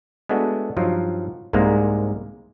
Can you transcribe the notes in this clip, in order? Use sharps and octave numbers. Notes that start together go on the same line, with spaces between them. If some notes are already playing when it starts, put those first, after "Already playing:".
G#3 A3 B3 D4 F#4
G2 F3 F#3 D#4 F4
C2 G#2 C3 G#3 A#3